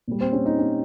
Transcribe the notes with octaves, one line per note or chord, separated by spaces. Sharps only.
A#2 G3
C4
C#4
D#4
C#4